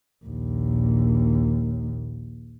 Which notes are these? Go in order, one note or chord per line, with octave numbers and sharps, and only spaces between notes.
A#1 D#2